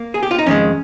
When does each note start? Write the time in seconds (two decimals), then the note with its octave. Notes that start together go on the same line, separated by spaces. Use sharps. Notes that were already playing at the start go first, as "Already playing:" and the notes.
Already playing: A#3
0.14 G#4
0.23 G4
0.31 F4
0.38 D#4
0.46 F2 D#3 G#3 C#4